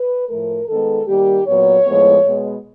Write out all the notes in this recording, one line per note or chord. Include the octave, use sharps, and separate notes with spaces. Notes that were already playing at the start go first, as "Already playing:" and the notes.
Already playing: B4
A2 F3 A3 A#4
D#3 G#3 B3 A4
D#3 G3 A#3 G4
A#2 F#3 B3 C#5
A2 F3 G#3 B3
B2 G#3 B3